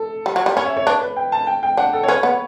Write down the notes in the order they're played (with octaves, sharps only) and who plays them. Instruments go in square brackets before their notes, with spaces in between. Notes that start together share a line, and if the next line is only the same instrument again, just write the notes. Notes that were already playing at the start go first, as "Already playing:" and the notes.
Already playing: [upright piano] A4
[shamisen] G3
F#3
G3
[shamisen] C#4 [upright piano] C#5
[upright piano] E5
C#5
[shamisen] D4 [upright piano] B4
[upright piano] B4
G5
A5
G5
G5
[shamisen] D4 [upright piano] F#5
[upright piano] A4
C#5
[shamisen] C#4 [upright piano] B4
[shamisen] B3 [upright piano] C#5